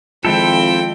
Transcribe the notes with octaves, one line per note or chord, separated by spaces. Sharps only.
F2 D#3 G#3 C4 E4 F4 A4 G5